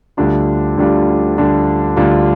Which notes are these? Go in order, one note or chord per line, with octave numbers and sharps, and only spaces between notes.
D2 D3 G3 D4 F4
D2 D3 G3 D4 F4
D2 D3 G3 D4 F4
D2 D3 G3 D4 F4